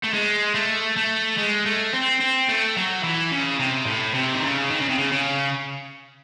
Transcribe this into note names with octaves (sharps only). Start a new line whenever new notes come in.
A3
G#3
A3
A3
G#3
A3
C4
C4
A3
F#3
E3
C#3
C3
A2
C3
D#3
C#3
D#3
C#3
C3
C#3
C#3